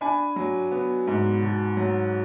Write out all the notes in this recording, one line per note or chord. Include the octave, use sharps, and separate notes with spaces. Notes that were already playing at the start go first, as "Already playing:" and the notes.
D4 G#5 B5
F#3
B3
G#2
B2
F#3